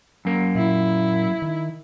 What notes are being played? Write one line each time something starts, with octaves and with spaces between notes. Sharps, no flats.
F#2 A#3
A#2 E4
D#3